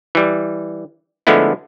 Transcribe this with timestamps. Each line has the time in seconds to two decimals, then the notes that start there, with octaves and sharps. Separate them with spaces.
0.15 E3 G3
1.27 D3 F3 G#3 A3 B3 E4